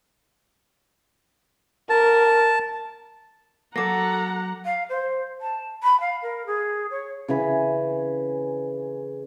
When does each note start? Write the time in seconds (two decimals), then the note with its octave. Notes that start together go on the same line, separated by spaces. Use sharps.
1.90 A#4 A5
3.76 F#3 A#3 F#4 A4 F#5 A#5 D6 A#6
4.64 F5
4.89 C5
5.41 A5
5.83 B5
6.00 F5
6.23 A#4
6.46 G#4
6.91 C#5
7.28 C#3 E3 G#5 B5